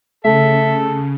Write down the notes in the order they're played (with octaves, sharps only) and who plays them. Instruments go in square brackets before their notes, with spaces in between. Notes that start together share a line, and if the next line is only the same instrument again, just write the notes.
[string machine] C#3 [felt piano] A3 [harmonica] A4 [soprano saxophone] E5